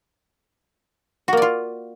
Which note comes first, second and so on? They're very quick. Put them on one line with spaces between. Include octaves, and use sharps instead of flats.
F#4 A#3 D5 F4